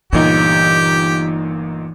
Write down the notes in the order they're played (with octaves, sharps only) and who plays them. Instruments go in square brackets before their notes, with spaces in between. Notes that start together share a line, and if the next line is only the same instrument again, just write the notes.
[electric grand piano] G1 A#2 D#4 [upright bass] E3 [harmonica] G4